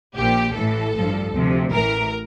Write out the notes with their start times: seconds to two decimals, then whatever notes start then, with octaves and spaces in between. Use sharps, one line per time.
0.15 A#1 A#2 F3 G4
0.54 A1 A2 E3 A4
0.94 A1 G2 F3
1.33 D2 C3 F3
1.71 A1 A2 E3 A#4